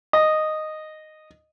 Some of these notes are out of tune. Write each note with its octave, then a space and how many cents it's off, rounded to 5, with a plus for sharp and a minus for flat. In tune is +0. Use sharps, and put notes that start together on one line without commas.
D#5 -5